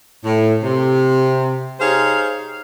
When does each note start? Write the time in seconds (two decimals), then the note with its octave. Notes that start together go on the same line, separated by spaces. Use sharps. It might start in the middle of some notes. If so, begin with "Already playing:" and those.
0.25 A2
0.63 C3
1.80 D#4 G4 G#4 C5 C#5 F5